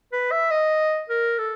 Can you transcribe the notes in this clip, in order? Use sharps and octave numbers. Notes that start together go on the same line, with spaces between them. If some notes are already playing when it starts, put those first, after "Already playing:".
B4
E5
D#5
A#4
A4